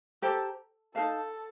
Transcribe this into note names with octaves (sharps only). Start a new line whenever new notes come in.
G4 A4 C5 G5 A#5
D#4 A4 A#4 F5 A5